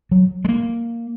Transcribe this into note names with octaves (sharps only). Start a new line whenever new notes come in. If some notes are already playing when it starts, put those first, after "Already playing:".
F#3
G#3
A#3